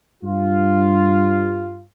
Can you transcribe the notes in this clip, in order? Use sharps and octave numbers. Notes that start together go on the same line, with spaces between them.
G2 F4